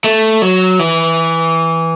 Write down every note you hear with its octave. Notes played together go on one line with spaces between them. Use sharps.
A3
F#3
E3